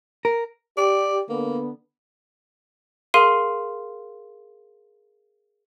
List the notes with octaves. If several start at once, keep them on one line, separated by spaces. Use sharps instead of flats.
A#4
G4 D5
D3 A#3 B3
G#4 A#4 F5 C6 C7 D#7